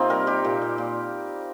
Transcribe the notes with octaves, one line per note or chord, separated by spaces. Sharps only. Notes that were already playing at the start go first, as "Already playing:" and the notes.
Already playing: C3 A#3 C4 D#4 F4
G3 A#4
G3 G4
A#2
A#2
A#2